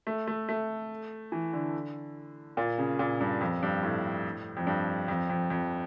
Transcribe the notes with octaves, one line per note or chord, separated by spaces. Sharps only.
A3
A3
A3
E3
D3
A#2
C#3
A#2
G2
F2
G2
A2
F2
G2
F2
F2
F2